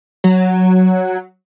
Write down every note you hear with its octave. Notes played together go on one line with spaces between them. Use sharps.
F#3